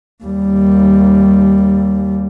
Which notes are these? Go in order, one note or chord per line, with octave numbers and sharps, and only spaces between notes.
D#2 G3